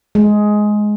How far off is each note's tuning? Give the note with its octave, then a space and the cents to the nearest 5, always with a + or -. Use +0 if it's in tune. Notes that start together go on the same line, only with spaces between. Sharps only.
G#3 +10